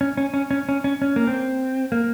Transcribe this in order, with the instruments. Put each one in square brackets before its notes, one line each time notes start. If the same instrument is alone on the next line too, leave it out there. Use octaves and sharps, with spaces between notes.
[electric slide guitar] C#4
C#4
C#4
C#4
C#4
C#4
C#4
A#3
C4
A#3